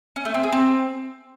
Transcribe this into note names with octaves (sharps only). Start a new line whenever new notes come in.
C#4
A3
C4
G#4
C4